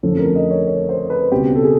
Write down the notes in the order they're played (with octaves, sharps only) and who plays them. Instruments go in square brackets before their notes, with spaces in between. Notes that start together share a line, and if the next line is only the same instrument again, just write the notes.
[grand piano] F2 D3 F3 A3 C#4 A4
A#4
D#5
C#5
C#5
C5
B4
C#2 B2 G3 C4 G4
A4
G#4